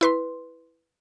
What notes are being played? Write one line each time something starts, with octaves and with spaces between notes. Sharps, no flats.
E4 B4 C6